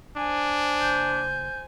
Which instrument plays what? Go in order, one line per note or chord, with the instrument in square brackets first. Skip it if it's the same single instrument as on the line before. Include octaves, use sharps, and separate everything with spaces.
[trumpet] D4 [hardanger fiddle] C5 G#5
[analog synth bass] F#1 [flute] G6